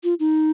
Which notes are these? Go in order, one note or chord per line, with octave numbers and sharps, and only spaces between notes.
F4
D#4